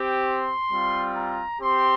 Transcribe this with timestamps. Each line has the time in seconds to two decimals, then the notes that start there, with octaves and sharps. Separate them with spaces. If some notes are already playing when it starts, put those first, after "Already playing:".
Already playing: C4 G4
0.26 C6
0.71 G3 C4 F4
1.16 A#5
1.61 C4 G4 C6